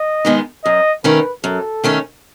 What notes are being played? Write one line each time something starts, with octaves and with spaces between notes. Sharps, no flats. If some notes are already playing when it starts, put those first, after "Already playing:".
Already playing: D#5
D#3 G#3 B3 D#4
F#2 D#5
D#3 A3 C#4 B4
F#2 A4
D#3 A3 C#4